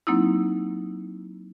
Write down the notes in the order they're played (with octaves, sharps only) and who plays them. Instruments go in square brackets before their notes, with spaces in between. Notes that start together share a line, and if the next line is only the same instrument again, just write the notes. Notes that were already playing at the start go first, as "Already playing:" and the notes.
[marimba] F#3 A#3 C4 D#4 E4